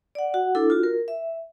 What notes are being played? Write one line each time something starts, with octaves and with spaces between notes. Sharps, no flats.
D5 F#5
F#4 F#5
D4 E4 A4
F4 F#4
A#4
E5